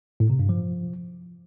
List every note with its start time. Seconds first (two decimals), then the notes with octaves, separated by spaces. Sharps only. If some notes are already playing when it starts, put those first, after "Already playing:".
0.20 A2
0.30 C3
0.40 G2
0.49 F3